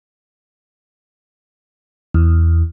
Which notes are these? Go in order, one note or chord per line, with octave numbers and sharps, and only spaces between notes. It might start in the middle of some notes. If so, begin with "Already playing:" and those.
E2